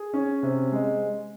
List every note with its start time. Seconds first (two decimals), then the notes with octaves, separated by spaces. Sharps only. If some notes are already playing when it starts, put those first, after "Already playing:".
Already playing: G#4
0.13 C#4
0.43 C3
0.72 G#3